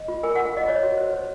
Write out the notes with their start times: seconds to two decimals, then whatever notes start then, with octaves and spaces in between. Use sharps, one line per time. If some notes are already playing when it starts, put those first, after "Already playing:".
Already playing: D#5
0.08 F4
0.23 A#4 G#5
0.35 F4 F#5
0.45 F5
0.54 F4 D#5
0.68 C5 C#5
0.83 F#4
0.97 C5
1.13 C5